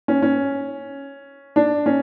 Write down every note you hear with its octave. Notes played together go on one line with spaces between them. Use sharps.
C#4
C#4
D4
C#4